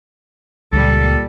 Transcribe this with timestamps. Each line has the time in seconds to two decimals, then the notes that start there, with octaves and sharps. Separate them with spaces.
0.73 C#2 A#2 G3 A4